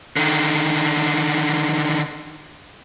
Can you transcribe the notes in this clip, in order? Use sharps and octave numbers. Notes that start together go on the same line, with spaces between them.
D3 D#3